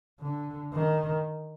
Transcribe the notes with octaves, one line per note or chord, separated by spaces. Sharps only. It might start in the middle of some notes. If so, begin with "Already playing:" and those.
D3
D#3